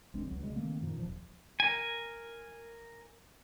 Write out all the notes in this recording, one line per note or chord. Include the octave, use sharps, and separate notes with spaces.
C#2 G#3 C4 D4
C#2 F#3
C#3 G3 G#3
D#3 A3 A#3 C4
F#2 A#2 D#3 F3
D#1 F3
A#4 G#5